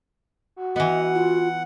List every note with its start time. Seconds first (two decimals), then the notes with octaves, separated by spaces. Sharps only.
0.56 F#4
0.76 E3 B3 D#5 F#5
1.15 F4